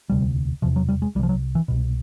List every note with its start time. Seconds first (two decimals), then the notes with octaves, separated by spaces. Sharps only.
0.10 E1 D2 C3 G3
0.62 E1 E2 C3 F3
0.76 F#3
0.89 G3
1.02 G#3
1.15 C2 G3
1.19 C3 F3
1.29 F#3
1.55 E3
1.68 C2 B2